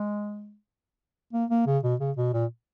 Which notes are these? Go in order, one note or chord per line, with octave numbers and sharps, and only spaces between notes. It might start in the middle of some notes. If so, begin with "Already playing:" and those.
Already playing: G#3
A#3
A#3
C#3
B2
C#3
B2
A#2